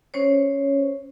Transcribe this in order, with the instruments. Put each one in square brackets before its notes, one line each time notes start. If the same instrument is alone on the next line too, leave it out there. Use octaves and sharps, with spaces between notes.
[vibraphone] C#4 C5 C#5